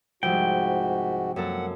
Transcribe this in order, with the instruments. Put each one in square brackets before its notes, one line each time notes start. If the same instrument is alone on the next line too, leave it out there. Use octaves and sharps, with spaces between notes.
[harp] C2 F3 G#3 [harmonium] G#2 F#4 [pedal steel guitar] G5
[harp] F#2 A#3 A4 [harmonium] F#5